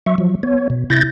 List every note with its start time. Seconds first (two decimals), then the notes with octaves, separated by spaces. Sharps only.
0.06 F#3 E5 C#6
0.18 F3 F#3
0.43 B3 C#5
0.70 B2
0.90 C3 E4 G6 A6 A#6